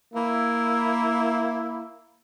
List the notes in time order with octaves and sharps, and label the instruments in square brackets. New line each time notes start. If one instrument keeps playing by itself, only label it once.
[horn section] A#3 E4